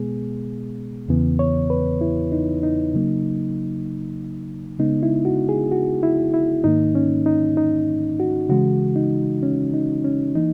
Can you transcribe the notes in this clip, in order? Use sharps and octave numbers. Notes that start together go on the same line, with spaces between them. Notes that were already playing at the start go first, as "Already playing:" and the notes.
Already playing: B2 G#3 B3 G#4
E2 C#3 E3 B3
C#5
B4
E4
D#4
D#4
C#3 F#3 A#3
C#3 G#3 B3 D#4
E4
F#4
G#4
F#4
E4
E4
G#2 D#3 A#3 D#4
C#4
D#4
D#4
F#4
C#3 E3 G#3 F#4
D#4
C#4
D#4
C#4
E3 A#3 D#4